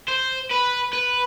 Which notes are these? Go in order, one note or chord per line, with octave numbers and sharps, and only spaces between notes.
C5
B4
B4